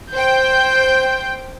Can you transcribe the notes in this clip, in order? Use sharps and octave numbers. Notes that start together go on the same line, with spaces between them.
C5 G5 G6